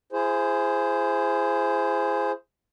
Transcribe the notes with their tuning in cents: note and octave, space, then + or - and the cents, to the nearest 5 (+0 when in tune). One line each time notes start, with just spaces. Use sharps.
E4 +40 G#4 +0 C5 +0